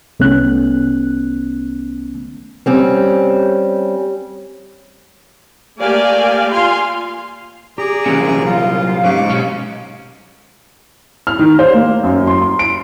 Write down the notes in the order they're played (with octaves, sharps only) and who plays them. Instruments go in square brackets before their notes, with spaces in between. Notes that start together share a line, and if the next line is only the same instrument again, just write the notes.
[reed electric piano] C2 A3 B3 C#4 F#6
[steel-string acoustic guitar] G3 C4 C#4
[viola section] A3 A#3 G4 D5 F5 G#5
F4 F5 G#5 C6
[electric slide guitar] G4 [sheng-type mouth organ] G#4 D5 A#5
[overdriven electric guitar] C2 A#2 [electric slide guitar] E3 F#3 C#4
[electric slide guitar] F#3 [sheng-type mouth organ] F4 [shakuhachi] F5
[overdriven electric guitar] G#2 [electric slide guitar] F#3 C#4 G4 [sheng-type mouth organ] C#6 D6
[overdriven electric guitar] G#2 C#4 [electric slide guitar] B2
[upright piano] F6
D#3
C5
A#3
F#2
C6
C6
D7